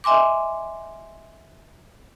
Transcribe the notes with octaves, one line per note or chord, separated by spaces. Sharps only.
D#5 E5 G#5 C6 D6